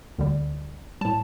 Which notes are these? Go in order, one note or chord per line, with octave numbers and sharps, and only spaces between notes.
D2 D3 G3
A2 G3 A5